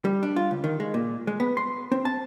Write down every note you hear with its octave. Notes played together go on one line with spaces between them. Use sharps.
G3
D4
F4
C#2
D#3
G#3
A#2
G#3
B3
C6
C4
A5